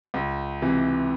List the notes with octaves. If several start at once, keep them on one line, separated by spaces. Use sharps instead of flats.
C#2
C3 E3